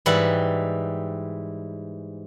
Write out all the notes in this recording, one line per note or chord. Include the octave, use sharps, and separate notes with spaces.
G#2 E3 G3 E4 F#5